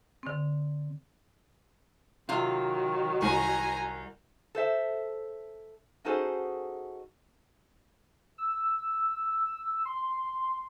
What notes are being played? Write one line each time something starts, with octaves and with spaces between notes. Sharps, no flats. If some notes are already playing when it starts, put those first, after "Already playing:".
D3 C4
C3 D#3 F#3 F4
C2 G#5 A#5
A4 C5 E5
C#4 D#4 F#4 G#4 A4 C5
E6
C6